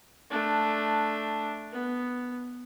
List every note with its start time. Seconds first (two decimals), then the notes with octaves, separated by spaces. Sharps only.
0.30 A3 D4
1.73 B3